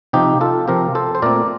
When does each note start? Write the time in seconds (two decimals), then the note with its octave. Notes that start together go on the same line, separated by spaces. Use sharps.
0.13 C3 F3 C4 D#4 G4
0.41 F4 A4
0.68 C3 F3 C4 G4 A#4
0.95 A4 C5
1.15 C5
1.22 A#2 A3 C4 A#4 D5